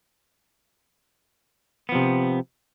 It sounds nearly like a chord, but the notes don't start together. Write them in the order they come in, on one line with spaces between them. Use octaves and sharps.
B3 F3 C3